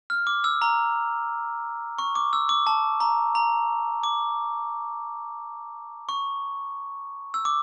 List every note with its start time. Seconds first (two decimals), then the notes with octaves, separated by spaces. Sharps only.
0.10 F6
0.27 D6
0.44 E6
0.62 A#5
1.99 C#6
2.15 D6
2.33 E6
2.49 D6
2.67 A5
3.00 A#5
3.35 A#5
4.03 D6
6.09 C#6
7.34 E6
7.45 D6